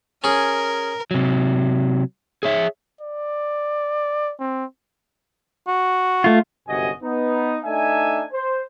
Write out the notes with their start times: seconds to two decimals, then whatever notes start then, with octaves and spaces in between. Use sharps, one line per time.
0.24 C#4 G#4 A#4
1.11 C3 F#3
2.43 G#4 C#5 E5
3.01 D5
4.39 C4
5.67 F#4
6.24 A3 F4
6.68 G1 F#2 C3 F#4 D#5 G#5
7.01 B3 D#4
7.64 A3 D4 D#4 E5 G#5
8.31 C5